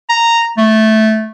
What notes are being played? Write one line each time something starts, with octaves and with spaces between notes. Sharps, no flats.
A#5
A3